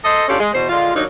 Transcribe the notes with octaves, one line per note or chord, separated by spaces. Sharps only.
A4 C5 D#5
C#4 D4 F4 G4 A4
G#3
E2 B2 C5
D3 G#3 F4
D#2 F#3 A#3 D4 D#4